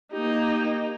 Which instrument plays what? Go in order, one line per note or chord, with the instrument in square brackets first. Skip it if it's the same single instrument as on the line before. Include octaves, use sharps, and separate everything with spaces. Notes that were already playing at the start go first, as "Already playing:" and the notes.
[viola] A#3 D#4 [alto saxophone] G4